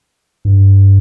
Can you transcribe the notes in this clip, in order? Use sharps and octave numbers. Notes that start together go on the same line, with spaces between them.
G2